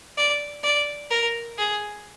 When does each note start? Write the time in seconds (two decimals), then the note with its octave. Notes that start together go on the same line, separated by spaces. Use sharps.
0.17 D5
0.63 D5
1.10 A#4
1.58 G#4